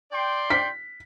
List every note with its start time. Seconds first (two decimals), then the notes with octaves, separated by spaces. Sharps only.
0.12 D5 G5 C6
0.50 B6